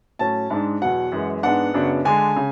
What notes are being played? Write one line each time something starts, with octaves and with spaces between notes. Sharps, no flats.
A2 F#3 C#4 A5
G#2 G#3 D4
E2 B2 F#3 F#5
F#2 E3 G#3
G#2 G#3 B3 D4 F#5
F#2 C#3 F#3 B3 D4
D3 G#3 D4 G#5
C#3